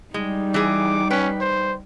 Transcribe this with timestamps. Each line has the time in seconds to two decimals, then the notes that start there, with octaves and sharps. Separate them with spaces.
0.14 G3 G#3 D#4
0.54 E3 G#4 D6
1.11 C#4 B4 G5
1.41 C5